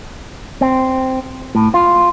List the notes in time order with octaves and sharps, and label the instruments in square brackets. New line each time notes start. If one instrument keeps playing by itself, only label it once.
[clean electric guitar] C4
A2
F4